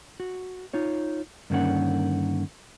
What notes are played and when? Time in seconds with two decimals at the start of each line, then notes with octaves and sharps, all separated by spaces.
0.20 F#4
0.74 D#4 F4 C#5
1.50 G2 D3 D#3 A#3 C#4 F#5